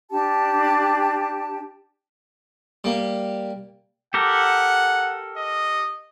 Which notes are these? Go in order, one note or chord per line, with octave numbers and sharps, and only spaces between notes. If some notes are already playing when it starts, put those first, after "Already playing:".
D4 G4 A5
G3 A#3
G4 A4 A#4 F#5
D#5